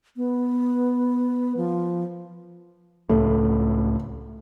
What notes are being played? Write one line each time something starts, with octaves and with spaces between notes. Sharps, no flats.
B3
F3
C#2 A2 A3